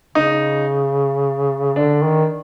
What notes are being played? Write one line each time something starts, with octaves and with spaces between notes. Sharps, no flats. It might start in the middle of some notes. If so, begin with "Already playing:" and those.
C#3 D#4
D3 D4
D#3